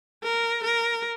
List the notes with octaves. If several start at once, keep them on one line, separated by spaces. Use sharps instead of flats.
A#4
A#4